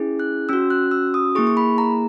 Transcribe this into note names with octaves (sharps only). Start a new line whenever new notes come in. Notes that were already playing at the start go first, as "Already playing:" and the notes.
Already playing: C#4 E4 G#4
F#6
C#4 F#4 E6
F#6
E6
D#6
A#3 E4 G#4 C#6
C#6
B5
A#5